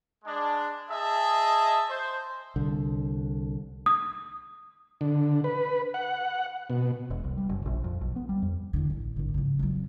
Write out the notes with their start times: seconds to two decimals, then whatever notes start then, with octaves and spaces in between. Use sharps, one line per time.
0.24 G#3 D4
0.90 G#4 D#5 E5 A5
1.89 C5
2.56 C2 D3
3.86 D#6
5.01 D3
5.44 B4
5.94 F#5
6.70 B2
7.10 E1
7.24 C2
7.37 G3
7.49 F#1
7.66 A#1
7.84 F2
8.01 B1
8.16 B3
8.29 G3
8.42 F2
8.73 E2 D3
8.90 A1
9.16 G#1 D3
9.34 C#3 F3
9.59 F2 F#3